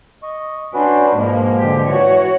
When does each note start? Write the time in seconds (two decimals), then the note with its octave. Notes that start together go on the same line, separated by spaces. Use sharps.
0.23 D#5 C#6
0.74 C#4 D4 F#4 B4 C5
1.16 G#2 B2 F3 G#3 A#3
1.59 D3 G4
1.87 E3 F#4 C#5